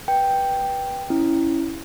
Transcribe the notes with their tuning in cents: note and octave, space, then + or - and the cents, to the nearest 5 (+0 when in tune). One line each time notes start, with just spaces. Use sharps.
B4 -15 G5 +0
C#4 +0 E4 +0